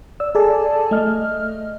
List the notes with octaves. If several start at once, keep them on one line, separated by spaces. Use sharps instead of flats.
D5 E6
G#4 A4 D5 G#5 A5
A3 D#5 F6